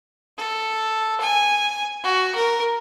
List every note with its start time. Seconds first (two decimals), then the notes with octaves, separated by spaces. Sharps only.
0.38 A4
1.21 G#5
2.04 F#4
2.35 A#4